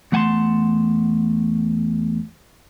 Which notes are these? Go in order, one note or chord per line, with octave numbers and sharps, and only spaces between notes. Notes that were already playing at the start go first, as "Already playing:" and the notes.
E2 A3 F#5 G#5 A5 C6